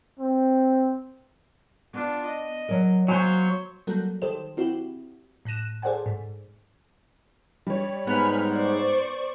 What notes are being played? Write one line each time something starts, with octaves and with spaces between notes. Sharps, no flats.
C4
B3 D4 F4
D#5
F#3 A#4
F#3 A#3 C5 C#5 G#5
F#3 G3 A#3 F#4 A4 A#4
D#3 G4 A4 C5 E7
C4 E4 F#4 G4
A2 F#6 A#6 D#7 E7
G#4 A4 C5 D5 F#5 G#5
G#2
G3 C#5
G#2 B3 G#5 B5 F6
C5 D5 C#6